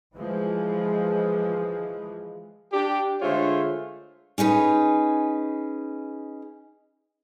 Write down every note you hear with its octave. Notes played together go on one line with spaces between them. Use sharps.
E3 F3 G#3
D4 G4
D3 G#3 A3 F4 C5 C#5
C#4 D#4 G#4 B4